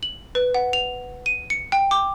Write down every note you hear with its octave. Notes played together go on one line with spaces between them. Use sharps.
F#7
B4
F#5
F7
D#7
C#7
G5
D6